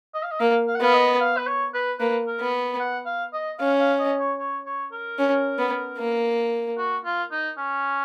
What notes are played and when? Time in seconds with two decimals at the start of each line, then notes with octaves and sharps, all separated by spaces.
0.14 D#5
0.23 F5
0.32 D#5
0.40 A#3 F5
0.68 F5
0.75 F#5
0.81 B3 F5
0.94 D#5
1.20 F5
1.37 B4
1.47 C#5
1.74 B4
2.00 A#3 B4
2.27 A#4
2.40 B3
2.80 F#5
3.06 F5
3.33 D#5
3.59 C#4 F5
3.79 F5
3.99 D#5
4.19 C#5
4.39 C#5
4.66 C#5
4.92 A#4
5.19 C#4
5.59 B3
5.98 A#3
6.78 F#4
7.05 F4
7.32 D#4
7.58 C#4